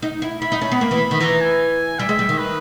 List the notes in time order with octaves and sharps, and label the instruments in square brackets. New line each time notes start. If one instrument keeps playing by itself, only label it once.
[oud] D#4
E4
[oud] E4 [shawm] B5
[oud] D#4
C#4
B3
A#3
E3
D#3
[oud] E3 [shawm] A#5
[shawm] G#5
[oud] G3 [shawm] E5
[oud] G#3
G3
D#3
[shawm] B4